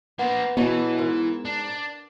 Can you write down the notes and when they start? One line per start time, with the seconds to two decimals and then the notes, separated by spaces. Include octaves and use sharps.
0.19 A#3 B3 C5 F#5
0.57 B2 E3 F#3 B3 G#4
0.99 G#2 A#4
1.45 D4